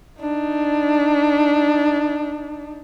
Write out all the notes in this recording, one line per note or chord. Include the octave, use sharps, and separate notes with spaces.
D4 D#4